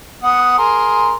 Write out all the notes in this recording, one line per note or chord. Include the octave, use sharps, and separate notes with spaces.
B3 F#5 D#6
G#4 A#4 C6